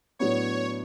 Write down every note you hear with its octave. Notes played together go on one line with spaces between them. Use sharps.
A2 F#3 B3 D4 C#5